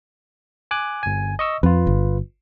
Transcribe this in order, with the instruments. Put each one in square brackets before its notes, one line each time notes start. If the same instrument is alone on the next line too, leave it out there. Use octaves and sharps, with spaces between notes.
[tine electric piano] G#5 D6 F#6
G1 G#5
D#5 C#6 E6
[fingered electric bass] F2 [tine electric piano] F4 B4
[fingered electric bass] G1